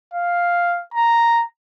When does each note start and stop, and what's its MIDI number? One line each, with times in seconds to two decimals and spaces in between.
0.14 0.82 77
0.94 1.43 82